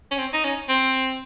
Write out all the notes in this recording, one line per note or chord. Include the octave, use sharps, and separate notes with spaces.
C#4
C4
D#4
C#4
C4